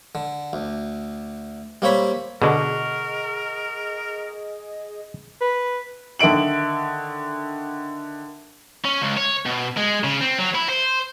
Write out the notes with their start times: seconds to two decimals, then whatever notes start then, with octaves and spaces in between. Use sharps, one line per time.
0.15 D3
0.53 D2
1.82 G3 A#3 C4 C#5 B5
2.42 B2 D3 G#4 A#4 D#5 F#5 C#6
5.41 B4
6.19 D3 D#3 E5 D7 F#7
8.85 C#4
9.01 C#2
9.17 C#5
9.46 B2
9.77 G#3
10.04 C#3
10.21 C4
10.39 F#3
10.54 E4
10.69 C5